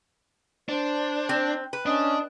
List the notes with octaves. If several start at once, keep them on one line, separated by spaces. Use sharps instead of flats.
D4 C5
C4
B4
C#4 D4 D#5